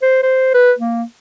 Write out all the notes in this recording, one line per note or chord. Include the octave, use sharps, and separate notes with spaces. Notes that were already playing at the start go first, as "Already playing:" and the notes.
C5
C5
B4
A#3